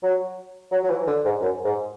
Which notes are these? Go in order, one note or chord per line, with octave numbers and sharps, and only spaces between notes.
F#3
F#3
F#3
E3
D3
G#2
F#2
G#2